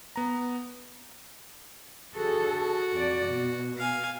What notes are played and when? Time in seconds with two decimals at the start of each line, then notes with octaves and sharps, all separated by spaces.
0.16 B3 A#5
2.14 D3 F#4 G#4 A4
2.92 F2 D5
3.26 B2
3.77 F5 G#5